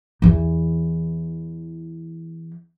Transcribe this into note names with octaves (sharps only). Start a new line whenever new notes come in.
E2 E3